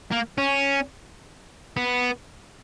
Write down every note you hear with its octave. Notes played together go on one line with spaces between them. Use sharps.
A#3
C#4
B3